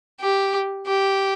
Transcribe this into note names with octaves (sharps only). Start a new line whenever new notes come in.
G4
G4